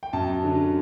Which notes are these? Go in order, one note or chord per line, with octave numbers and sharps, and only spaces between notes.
G5
F#2 A5
D3 F#3